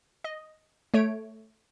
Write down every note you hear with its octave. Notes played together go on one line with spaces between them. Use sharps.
D#5
A3 C#5 D7